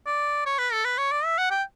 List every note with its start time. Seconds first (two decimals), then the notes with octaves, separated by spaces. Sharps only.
0.07 D5
0.46 C#5
0.59 B4
0.73 A4
0.85 B4
0.98 C#5
1.12 D5
1.25 E5
1.38 F#5
1.51 G5